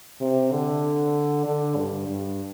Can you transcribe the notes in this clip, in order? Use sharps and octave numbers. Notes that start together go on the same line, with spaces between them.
C3
D3
D3
G2
G2